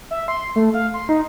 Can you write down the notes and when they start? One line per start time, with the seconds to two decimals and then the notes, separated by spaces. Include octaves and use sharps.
0.11 E5
0.28 C6
0.56 A3
0.74 F5
0.94 C6
1.09 D#4